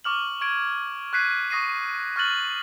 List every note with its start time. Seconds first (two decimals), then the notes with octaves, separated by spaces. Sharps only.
0.05 C#6 D6 F6 F#7
0.41 C#6 G#6 D7
1.13 C#6 F#6 G#6 B6 C7 D#7
1.51 C#6 D#6 A#6 C7 D#7
2.16 C#6 F6 F#6 A6 F#7